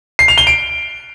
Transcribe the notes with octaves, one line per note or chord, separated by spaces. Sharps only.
C7
F7
G7
D7